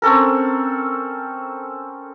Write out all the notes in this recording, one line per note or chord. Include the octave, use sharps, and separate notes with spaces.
C4 C#4 A4 A#4